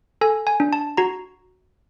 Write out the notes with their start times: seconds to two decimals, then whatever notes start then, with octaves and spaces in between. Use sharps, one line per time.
0.21 A4 G#5
0.47 G#5
0.60 D4
0.73 A5
0.97 F#4 A#5